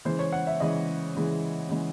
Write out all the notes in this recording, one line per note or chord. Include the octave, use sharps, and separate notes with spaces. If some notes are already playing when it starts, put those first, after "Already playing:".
C#3 E3 G#3 C5
C#5
F#5
E5
C#3 E3 G#3 D#5
C#3 E3 G#3
C#3 E3 G#3